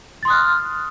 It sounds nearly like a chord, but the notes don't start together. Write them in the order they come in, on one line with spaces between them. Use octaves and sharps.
A6 C6 D#6 F#6 F6